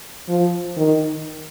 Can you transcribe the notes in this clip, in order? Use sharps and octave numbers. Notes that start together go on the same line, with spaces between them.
F3
D#3